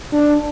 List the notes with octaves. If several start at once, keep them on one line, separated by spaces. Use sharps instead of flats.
D4